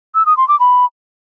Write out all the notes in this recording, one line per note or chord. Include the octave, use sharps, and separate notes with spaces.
E6
D#6
C6
D6
B5